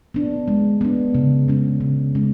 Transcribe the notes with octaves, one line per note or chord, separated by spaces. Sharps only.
B3 D4
G#3
B3 D4
C#3
G#3 C#4
C#3
G#3 C#4